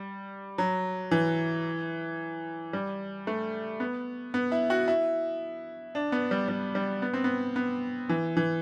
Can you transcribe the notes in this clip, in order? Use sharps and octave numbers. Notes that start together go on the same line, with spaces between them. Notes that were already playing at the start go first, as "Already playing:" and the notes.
Already playing: G3
F#3
E3
G3
A3
B3
B3
E4
F#4
E4
D4
B3
G3
G3
G3
B3
C4
B3
B3
E3
E3